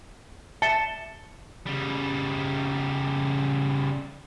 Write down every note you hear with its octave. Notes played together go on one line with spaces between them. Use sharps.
E5 A5 C#7 G7
C#3 G3